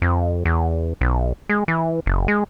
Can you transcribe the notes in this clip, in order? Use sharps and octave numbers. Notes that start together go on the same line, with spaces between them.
F2
E2
B1
G#3
E3
F#1
G#3